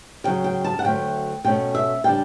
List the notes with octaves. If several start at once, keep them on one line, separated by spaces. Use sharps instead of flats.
D2 C#3 F#3 G5
G5
A5
F#5
D2 C#3 F#3 A3 G5
B2 A3 C#4 G5
E5
C#3 G3 D4 G5